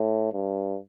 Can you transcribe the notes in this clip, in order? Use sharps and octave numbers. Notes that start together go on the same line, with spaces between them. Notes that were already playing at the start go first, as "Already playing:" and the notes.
Already playing: A2
G2